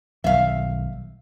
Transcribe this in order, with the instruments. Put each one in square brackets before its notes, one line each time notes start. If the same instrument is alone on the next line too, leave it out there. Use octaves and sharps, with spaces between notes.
[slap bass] B1 D#3 G3 [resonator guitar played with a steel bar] E5 F5